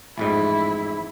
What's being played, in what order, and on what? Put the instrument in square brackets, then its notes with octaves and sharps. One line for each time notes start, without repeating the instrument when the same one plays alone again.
[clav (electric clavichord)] A1 F2 G#2 [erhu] E4